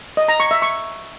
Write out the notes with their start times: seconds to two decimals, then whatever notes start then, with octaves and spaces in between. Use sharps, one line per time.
0.17 D#5
0.28 A#5
0.40 C#6
0.51 E5
0.62 C#6